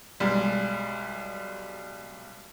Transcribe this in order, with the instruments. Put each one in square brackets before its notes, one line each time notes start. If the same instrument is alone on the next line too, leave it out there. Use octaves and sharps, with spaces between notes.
[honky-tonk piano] B1 G3 G#3